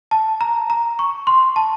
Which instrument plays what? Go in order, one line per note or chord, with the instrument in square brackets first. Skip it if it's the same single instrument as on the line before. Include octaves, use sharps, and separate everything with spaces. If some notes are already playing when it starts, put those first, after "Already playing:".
[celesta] A5
A#5
A#5
C#6
C6
A5